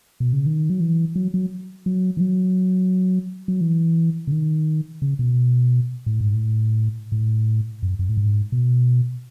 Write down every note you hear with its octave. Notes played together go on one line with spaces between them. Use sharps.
B2
C#3
D#3
F#3
E3
F#3
F#3
F#3
E3
F#3
F#3
E3
C#3
D#3
C#3
B2
A2
G#2
A2
A2
F#2
F#2
A2
G#2
B2